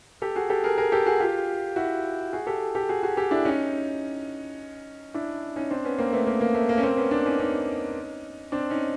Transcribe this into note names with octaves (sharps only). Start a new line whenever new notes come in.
G4 A4
F#4 G#4
G4 A4
G#4 A#4
G#4 A#4
G4 A4
F#4 G#4
F4 G4
E4 F#4
F#4 G#4
G4 A4
G4 A4
F#4 G#4
F#4 G#4
G4 A4
D4 E4
C#4 D#4
D4 E4
C#4 D#4
C4 D4
B3 C#4
A#3 C4
A3 B3
A#3
A#3
A3
A#3
C#4
A#3 C4
B3 C#4
C4 D4
C#4 D#4
C#4 D#4
C4 D4
C#4 D#4